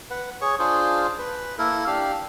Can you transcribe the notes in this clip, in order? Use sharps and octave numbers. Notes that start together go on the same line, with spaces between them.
B4 F#5
G#4 C#5 C#6
D4 F4 G#4 C5
B4
A#3 E4 A4 A#4
D4 G4 F5